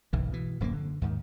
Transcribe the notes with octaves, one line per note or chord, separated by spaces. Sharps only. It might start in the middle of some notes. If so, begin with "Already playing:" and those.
F#1 B1 G#2 E3
B2 E3
D1 F#2 F3 A#3
D3
D#2 G#2 D#3